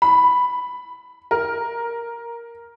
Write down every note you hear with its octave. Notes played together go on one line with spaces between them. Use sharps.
B5
A#4